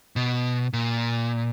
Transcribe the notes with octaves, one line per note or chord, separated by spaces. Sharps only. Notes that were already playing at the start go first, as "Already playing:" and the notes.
B2
A#2